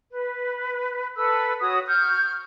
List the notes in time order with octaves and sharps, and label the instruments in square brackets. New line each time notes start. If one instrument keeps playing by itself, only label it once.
[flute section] B4
A4 B4 E6
F#4 C#5 D#6
C#6 F6 G6